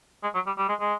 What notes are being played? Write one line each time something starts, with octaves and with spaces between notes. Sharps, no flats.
G#3
F#3
G3
G3
G#3
G#3